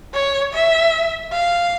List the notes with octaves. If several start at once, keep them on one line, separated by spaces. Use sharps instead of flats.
C#5
E5
F5